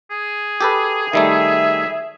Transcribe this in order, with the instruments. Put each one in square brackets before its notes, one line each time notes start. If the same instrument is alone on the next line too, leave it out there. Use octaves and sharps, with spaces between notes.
[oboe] G#4
[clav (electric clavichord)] G4 A4 B4
[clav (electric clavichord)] D#3 G3 A3 [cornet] E5